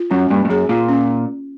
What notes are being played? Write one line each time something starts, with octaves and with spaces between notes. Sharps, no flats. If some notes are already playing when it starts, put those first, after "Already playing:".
Already playing: F4
F#2 C#4
G2 A#3
G2
F#2 G#4
A#2 F4
C#4